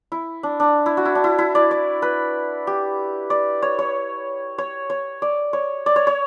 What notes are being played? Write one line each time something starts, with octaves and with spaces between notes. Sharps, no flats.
E4
D4
D4
E4
F#4
E4
D4
E4
E4
D5
D5
B4
G4
D5
C#5
C#5
C#5
C#5
D5
C#5
D5
C#5
C#5